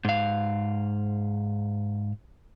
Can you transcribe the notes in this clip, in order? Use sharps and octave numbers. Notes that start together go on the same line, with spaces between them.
G#2 F5